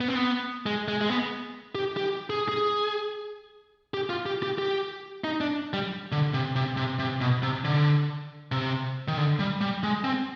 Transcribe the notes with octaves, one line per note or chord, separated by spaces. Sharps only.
B3
C4
B3
G#3
G#3
G#3
B3
G4
G4
G#4
G#4
G4
F4
G4
G4
G4
D#4
D4
G3
D3
C3
C3
C3
C3
B2
C3
D3
C3
D#3
D3
G3
G3
G#3
C4